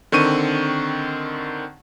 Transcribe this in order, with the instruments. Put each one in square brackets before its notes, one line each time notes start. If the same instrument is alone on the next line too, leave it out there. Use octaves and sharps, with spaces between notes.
[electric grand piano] D3 D#3 C4 C#6 D#7